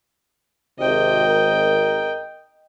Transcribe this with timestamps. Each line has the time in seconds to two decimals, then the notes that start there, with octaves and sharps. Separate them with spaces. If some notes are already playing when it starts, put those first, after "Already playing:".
0.79 G#1 C3 D#5 G5
1.27 A#4